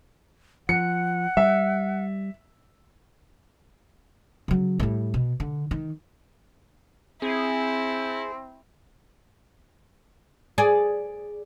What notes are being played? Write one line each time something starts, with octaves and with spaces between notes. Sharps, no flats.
F3 F#5 C#7
G3 E5
C#3 F#3
A2 G3
B2
D3
D#3
C4 E4 G#4
G#4 D5